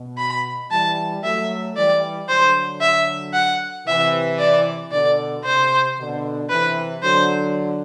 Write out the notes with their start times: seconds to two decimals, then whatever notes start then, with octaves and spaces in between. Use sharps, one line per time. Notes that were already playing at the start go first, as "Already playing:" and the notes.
Already playing: B2
0.18 B5
0.71 E3 G3 A5
1.23 F#3 A3 E5
1.76 E3 G3 D5
2.29 D3 F#3 C5
2.81 E5
3.34 F#5
3.87 C3 E3 E5
4.39 D5
4.92 B2 D3 D5
5.45 C3 C5
5.98 B2 D3
6.49 C3 E3 B4
7.03 D3 F#3 C5